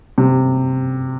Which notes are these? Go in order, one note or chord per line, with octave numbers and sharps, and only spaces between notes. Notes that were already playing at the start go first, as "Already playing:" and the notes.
C3